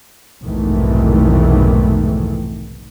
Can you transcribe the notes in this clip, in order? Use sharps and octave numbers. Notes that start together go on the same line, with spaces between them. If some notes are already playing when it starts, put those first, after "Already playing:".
F1 B1 G#2 D#3 E3 A3